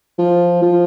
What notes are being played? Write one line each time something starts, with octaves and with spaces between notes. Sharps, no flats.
F3
F3